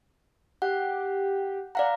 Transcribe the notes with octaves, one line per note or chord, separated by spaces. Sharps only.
G4 F#5
D5 F5 F#5 A#5